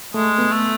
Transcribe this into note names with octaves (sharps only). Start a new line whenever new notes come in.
G#3 A3
B3
A3